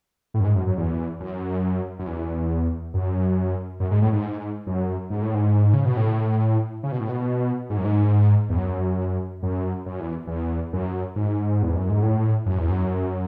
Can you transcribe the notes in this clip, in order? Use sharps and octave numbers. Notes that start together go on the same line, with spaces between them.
A2
F#2
G#2
F#2
F#2
E2
F#2
F#2
E2
F#2
F#2
G#2
A2
G#2
F#2
G#2
A2
G#2
C#3
B2
A2
C#3
B2
A2
B2
G#2
F#2
G#2
E2
F#2
F#2
F#2
E2
E2
F#2
G#2
E2
F#2
G#2
A2
F#2
E2
F#2